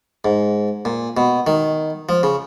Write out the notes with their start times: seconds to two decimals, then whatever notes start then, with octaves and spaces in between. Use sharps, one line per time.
0.25 G#2
0.85 A#2
1.17 B2
1.47 D#3
2.09 F3
2.23 C#3